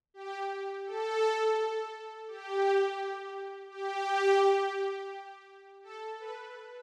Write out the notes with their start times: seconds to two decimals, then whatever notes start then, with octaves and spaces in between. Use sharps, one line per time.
0.14 G4
0.86 A4
2.28 G4
3.70 G4
5.84 A4
6.20 B4